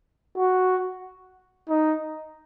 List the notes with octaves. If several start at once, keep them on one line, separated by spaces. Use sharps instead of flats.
F#4
D#4